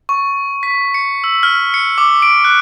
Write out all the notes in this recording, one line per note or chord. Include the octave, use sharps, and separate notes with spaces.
C#6
B6
C#7
E6
F6
C#7
D6
D7
F#6